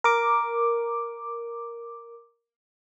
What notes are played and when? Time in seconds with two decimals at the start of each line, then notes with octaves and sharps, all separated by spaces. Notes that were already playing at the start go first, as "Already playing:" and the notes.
0.04 A#4 D6